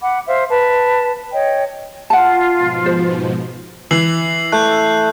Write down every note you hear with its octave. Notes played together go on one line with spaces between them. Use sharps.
F#5 B5 D6
C5 E5 F5
B4 A5
C#5 D#5 G5
F4 F#5 A5
G#2 B2 F3
C5
E3 C7 F#7
A3 F#6 G6